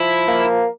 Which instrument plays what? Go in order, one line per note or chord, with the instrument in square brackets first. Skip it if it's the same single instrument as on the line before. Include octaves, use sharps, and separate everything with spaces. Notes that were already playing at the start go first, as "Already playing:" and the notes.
Already playing: [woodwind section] F3 [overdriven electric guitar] E4
[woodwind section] A#3